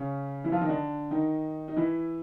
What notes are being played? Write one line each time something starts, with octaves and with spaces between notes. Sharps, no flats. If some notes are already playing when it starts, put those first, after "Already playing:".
Already playing: C#3 C#4
E3 E4
F3 F4
D#3 D#4
D3 D4
D#3 D#4
D#4
E3 E4